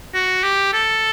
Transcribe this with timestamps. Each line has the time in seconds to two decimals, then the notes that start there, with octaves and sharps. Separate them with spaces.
0.14 F#4
0.44 G4
0.73 A4